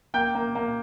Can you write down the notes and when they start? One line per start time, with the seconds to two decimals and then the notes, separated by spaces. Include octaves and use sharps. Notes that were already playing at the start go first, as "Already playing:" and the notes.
0.14 A#3 G5 G6
0.35 A#3
0.55 A#3